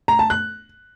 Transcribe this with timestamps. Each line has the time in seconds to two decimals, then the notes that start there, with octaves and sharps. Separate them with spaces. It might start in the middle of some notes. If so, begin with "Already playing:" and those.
0.08 A#5
0.19 A5
0.30 F#6